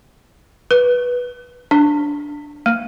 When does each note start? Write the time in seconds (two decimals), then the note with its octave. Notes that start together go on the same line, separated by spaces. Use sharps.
0.71 B4
1.71 D4
2.66 A#3